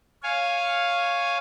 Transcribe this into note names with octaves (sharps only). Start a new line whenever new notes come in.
C#5 F5 G#5